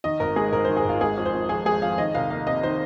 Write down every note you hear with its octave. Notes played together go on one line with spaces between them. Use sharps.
D#3 D#5
G#1 A#4
G#3 G#4
G#2 A#4
D#3 C5
G#4
G#1 F4
G#3 G#4
F2
C5
F2
F3 G#4
G#3 G#4
F2 F5
D#3 D#5
C2 F5
A#3 F5
C3 D#5
D#3 C5